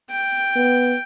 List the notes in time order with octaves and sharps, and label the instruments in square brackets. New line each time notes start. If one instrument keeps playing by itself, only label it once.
[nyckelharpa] G5
[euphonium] B3